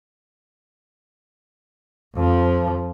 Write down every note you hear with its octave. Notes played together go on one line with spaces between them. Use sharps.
F2 F3